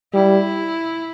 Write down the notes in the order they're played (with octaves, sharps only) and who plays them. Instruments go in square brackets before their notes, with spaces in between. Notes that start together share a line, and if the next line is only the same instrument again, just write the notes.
[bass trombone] G3 [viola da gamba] E4